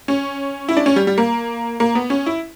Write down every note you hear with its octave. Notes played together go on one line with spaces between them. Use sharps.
C#4
E4
D4
C#4
G3
G3
A#3
A#3
B3
C#4
E4